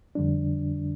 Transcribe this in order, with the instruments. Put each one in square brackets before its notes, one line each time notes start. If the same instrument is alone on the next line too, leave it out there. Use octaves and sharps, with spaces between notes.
[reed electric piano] F2 D3 G3 D4